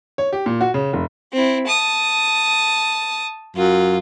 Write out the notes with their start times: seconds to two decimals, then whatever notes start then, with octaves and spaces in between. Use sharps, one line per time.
0.18 C#5
0.33 G4
0.46 A#2
0.61 F#4
0.74 C#3
0.93 F1
1.33 C4 E4
1.67 A5 D#6
3.56 F#2 F4